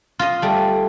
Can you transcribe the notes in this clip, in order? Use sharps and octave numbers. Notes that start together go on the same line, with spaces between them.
F4 D#5
G3 A3